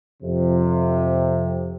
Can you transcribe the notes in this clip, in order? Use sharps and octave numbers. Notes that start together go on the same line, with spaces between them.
F2 C3